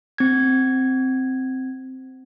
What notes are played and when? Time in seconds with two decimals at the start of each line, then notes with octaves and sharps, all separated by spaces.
0.18 C4 G#6